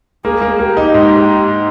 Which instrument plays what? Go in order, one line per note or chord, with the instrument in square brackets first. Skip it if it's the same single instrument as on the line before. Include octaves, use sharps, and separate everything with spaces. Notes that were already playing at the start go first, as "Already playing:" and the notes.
[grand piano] A#3 [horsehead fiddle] G#4
[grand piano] A#3
[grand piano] A#3 [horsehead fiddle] G4
[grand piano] D#4
G#2